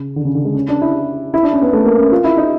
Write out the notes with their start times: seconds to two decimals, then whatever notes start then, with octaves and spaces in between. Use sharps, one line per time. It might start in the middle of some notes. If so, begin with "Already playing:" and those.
Already playing: C#3
0.16 D3
0.25 C#3
0.35 D3
0.45 G#3
0.54 C#4
0.68 D4
0.81 E4
1.34 E4
1.43 D4
1.53 C#4
1.62 B3
1.73 A3
1.85 A#3
1.98 C#4
2.12 F4
2.24 E4
2.37 D#4